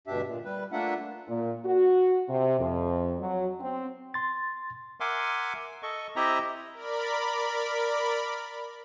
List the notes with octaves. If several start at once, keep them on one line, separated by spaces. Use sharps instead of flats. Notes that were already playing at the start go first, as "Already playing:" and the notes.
D2 G2 B2 D4 G4 E5
A#2
G3 B4
A3 A#3 D4 F4 E5 F#5
A#2
F#4
C3
F2
F#3
C4
C6 A6
A#4 E5 F#5 G#5 C6 D6
A4 D#5 C#6
C4 E4 G4 D#5 E5 A#5
A#4 D5 B5